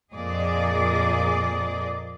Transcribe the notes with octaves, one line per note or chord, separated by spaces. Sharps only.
F2 A#2 G#4 D5 D#5